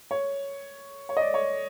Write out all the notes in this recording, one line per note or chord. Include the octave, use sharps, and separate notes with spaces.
C#5
C#5
D#5
D5
C#5